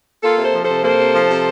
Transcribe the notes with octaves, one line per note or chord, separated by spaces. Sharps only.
A#3 F4 A4
C3
A4 C5
F3
C3 A4 C5
A#3 A4 C5
C3
F3
C3